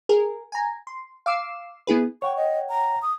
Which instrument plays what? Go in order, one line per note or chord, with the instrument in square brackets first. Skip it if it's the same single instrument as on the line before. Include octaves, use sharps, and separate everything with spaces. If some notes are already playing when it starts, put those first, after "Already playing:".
[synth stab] G#4 A#4
G#5 A#5
C6
F5 D6 E6 C7 E7
B3 E4 G#4 B4
[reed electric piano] C#5 F#5 G5 [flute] C#6
[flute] D#5
A#5
D#6